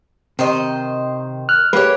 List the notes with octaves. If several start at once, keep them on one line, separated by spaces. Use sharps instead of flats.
C3 D#3 C5 D#5
F6 F#6
G#3 A#3 G4 B4 C#5